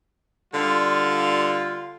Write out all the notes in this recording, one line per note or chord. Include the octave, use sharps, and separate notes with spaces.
D3 G3 F4